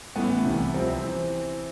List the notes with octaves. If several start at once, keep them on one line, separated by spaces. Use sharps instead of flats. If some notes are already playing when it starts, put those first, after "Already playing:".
A1 A2 E3 B3
C2 C3 E3
C2 C3 F3 C4
E3